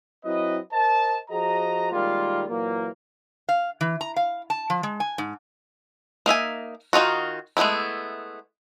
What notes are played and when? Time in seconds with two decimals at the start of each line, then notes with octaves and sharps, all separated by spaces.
0.25 F#3 C4 E4 B4 D#5
0.73 A#4 C5 D#5 A5
1.30 F3 F#4 G#4 D#5 A#5
1.92 D#3 G3 G#3 A#3 F4
2.49 A#2 E3 F#3 A#3
3.49 F5
3.81 E3
4.01 A#5
4.16 F5
4.50 A5
4.70 F3
4.83 G#3
5.00 G#5
5.18 G#2
6.26 A#3 D#4 E5 G#5
6.93 D#3 D#4 F4 F#4
7.57 G#3 A3 B3 C4 E4